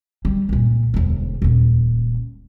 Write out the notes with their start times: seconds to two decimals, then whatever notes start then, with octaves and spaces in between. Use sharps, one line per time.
0.25 G3
0.49 C#2 A#2
0.94 E1 D2
1.42 D#1 C#2